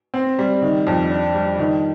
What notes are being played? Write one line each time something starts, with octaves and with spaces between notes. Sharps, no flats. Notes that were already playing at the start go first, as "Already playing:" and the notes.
C4
G3
D#3
F2
D4
G3
D#3